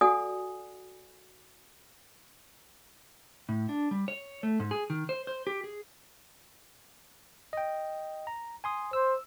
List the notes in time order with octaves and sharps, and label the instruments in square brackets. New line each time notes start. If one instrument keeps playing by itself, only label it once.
[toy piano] F#4 A4 D5 F#5 G#5 D#6
[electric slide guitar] A2
D4
G3
C#5
A3
G#2
G#4
D#3
C5
C5
G4
G#4
[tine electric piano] D#5 G5
A#5
G#5 C6 D#6
[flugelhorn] C5 [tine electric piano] E6